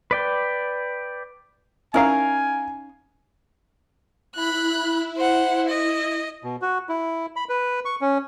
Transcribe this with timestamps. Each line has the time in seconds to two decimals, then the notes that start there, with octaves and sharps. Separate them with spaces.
0.11 B4 D5 G5
1.94 C#4 D#4 E4 A#4 F5 G#5
4.35 E4 B5 F#6
5.17 C5 F#5
5.69 D#5
6.44 B2
6.62 F#4
6.89 E4
7.36 B5
7.49 B4
7.85 C#6
8.01 C#4